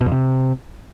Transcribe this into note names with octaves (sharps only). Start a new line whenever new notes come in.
B2
F2
C3